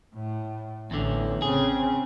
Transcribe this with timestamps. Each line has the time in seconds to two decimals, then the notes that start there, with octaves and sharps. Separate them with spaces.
0.15 A2
0.91 A1 E2 D3
1.42 C#3 C4 G#4